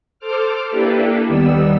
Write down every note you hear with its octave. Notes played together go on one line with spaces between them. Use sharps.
A4 C5 D6 F6
A#3 D4 E4 G4 A4 B4
D#2 D#3 G3 B3 E6